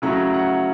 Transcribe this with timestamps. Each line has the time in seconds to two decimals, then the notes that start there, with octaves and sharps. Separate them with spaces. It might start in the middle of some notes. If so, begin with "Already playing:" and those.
0.02 C#3 F#3 A3 C#4 E4 A#5
0.34 F#5